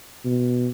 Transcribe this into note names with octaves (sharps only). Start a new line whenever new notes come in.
B2